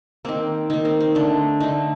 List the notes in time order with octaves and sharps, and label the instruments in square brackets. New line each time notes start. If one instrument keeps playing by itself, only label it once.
[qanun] D#3 A#3 C4
D#3 A#3 D#4
C4
C4
D3 A3 D4
D3 A3 D#4